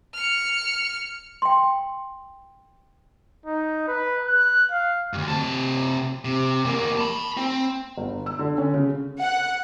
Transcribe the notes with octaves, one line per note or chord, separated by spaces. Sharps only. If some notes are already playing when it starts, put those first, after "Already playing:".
F6 C#7
G5 C6
D#4
B4
F#6
F5
D2 G2
C3 A5
C3
E2 A#3
A5 B5
C4
G1
E6
D3
C#4
C#3
F#5